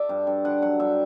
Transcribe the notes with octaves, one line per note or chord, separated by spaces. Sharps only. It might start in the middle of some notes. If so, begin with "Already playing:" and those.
Already playing: A4 D5 E5
G2
G2
D3 F#5
F#3 F#5
G2 E5